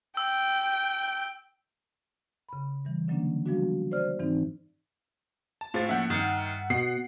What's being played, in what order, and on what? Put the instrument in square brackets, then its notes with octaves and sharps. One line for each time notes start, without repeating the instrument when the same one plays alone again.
[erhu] G5 [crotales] E6
[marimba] C#3 B5
E3 G3
D3 F#3 A#3 C#4 D4
F3 G3 G#3 B3 D4 F#4
C5 D5 F6
G#2 E3 C4 D#4
[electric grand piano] A5
[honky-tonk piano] A2 [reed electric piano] A3 G#4 C5 [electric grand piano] F4 A6
[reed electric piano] F3 A#3 C#4 [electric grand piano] E5 F#5 G6
[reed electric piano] G2 F6 [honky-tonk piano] D#3
[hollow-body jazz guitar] B2 [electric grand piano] F#5 [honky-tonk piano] C7